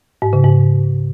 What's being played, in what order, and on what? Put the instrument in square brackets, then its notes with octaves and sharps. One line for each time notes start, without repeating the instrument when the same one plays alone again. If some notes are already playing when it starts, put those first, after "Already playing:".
[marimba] G#2
C#3
G#2